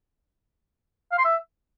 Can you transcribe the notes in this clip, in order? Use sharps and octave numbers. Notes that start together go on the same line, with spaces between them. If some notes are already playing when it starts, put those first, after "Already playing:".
F5
C6
E5